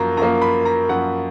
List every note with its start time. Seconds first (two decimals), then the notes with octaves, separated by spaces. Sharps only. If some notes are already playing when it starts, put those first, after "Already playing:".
Already playing: F#2 F3 A#3 A#5
0.17 F#2 F3 A#3 A#5
0.42 B5
0.65 A#5
0.89 F#2 F3 A#3 F#5